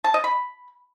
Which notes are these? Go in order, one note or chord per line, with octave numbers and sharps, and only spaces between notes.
A5
D#5
B5